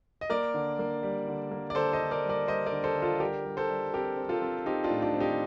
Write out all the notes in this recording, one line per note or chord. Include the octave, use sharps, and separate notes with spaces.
D#5
A#3 A#4 D5
D3
A#3
G3
D3
A#3
D5
D3 A4 C5
C5 D#5
D3
A#4 D5
G3
A#4 D5
G3 C5 D#5
A#4 D5
D3
A4 C5
D3
F4 A4
G3 G4 A#4
G3
A4 C5
G3
C4 G4 A#4
C4
F4 A4
C4
C4 D#4 G4
D4 F4
A2
D4 F4
C4
D#4 G4